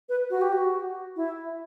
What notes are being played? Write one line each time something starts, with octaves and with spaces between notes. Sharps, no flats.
B4
F#4
G4
F#4
E4